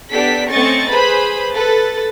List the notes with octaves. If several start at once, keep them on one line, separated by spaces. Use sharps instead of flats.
B3 D4 G4 A4 B6
A3 C4 C#4 D#5 C#6 A6
G#4 B4 C5 B5
A4 B4 A6